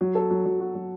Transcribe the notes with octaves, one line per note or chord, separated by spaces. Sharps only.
F#3
A4
F#3
F#3
F#4
F#3